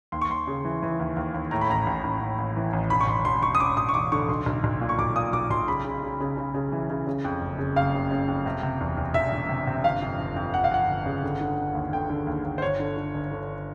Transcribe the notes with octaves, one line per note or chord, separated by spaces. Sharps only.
D#2 C6
C#6
D#2 C6
C#3
E3
E3
D#2
D#2
D#2
A2 A#5
B5
A1 A#5
A1
A1
A1
A1
E3
A1
E1 B5
C#6
E1 C6
E1 C6
E1 C#6
D#6
E1 D6
E1 D#6
C#6
E1 D6
D3 C#6
B1 C6
B1
B1
A#2
C#6
B1 D6
A#2 D#6
B1 D6
B1 C6
C#3 B5
C#3
C#3
C#3
C#3
C#3
E3
C#3
C#3
F2
F#1
C#3
F#1 F5
C#3
C#3
F2
C3
C3
E2
E2
E1 E5
E1
C3
C3
G1 F5
F2
G1
F2
G1 F#5
F5
F2 F#5
G1
C#3
D3
D3
D3
D#2
D3 G5
D3
D#2
D#2
C5
G1 C#5
D3
D3
G1
D3